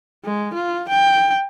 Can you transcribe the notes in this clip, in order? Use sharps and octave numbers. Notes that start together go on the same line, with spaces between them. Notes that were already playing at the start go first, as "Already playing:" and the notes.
G#3
F4
G5